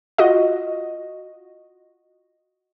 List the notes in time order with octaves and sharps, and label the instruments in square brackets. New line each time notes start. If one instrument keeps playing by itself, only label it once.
[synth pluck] F4 F#4 D#5